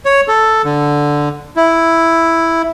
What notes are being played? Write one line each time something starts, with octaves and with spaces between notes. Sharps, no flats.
C#5
A4
D3
E4